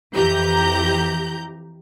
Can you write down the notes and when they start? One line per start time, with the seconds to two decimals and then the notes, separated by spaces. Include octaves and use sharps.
0.14 F2 E3 G4 A#5 G6